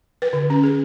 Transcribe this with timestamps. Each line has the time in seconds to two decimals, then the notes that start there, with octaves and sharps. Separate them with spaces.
0.22 B4
0.33 D3
0.50 C#4
0.63 G#4